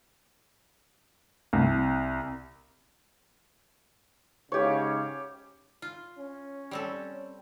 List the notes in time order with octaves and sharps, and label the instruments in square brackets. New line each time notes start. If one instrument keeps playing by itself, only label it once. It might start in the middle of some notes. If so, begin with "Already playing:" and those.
[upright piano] C2
[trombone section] G#2 C#3 [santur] G4 C#5
[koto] F4
[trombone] C#4
[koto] G3 C4 A4